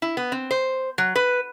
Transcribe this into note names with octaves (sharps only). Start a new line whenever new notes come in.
E4
B3
C4
C5
F#3
B4